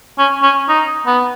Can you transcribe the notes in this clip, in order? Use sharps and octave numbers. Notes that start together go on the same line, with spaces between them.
C#4
C#4
D#4
B3